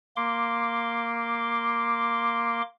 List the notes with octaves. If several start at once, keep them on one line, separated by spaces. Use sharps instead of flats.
A#3 C6 D6